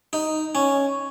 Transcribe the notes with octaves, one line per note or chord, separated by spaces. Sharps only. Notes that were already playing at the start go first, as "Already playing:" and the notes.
D#4
C#4